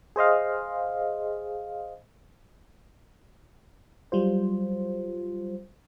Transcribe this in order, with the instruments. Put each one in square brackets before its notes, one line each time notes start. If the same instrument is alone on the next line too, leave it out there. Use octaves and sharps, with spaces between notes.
[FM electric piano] G#4 C5 D#5 F5
F#3 G3 F4 C5